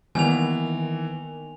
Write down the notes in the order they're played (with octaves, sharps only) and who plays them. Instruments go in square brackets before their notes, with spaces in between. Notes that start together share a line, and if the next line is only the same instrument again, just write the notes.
[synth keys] D#3 [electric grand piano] E3 [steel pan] G3 A#3 B3 [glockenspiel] G#5 F7